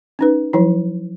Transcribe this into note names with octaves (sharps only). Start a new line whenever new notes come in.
C#4 D#4 B4
F3 F#3 E4